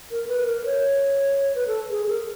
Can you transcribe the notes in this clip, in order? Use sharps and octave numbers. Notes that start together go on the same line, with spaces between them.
A#4
B4
A#4
C#5
B4
A4
G#4
A#4